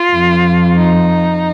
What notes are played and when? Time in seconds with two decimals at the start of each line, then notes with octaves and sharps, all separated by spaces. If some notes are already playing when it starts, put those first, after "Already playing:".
Already playing: F4
0.11 F2 F3
0.75 D#4